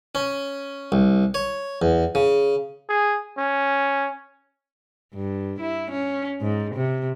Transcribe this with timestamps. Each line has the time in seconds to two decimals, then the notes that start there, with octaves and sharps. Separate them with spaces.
0.15 C#4
0.92 C2
1.34 C#5
1.82 E2
2.15 C#3
2.89 G#4
3.38 C#4
5.14 G2
5.60 E4
5.91 C#4
6.41 G#2
6.75 C3